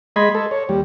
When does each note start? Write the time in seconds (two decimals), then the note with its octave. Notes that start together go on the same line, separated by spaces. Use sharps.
0.16 G#3 D#5 B5 C6 G#6
0.35 A4
0.51 C#5
0.69 D#2 G3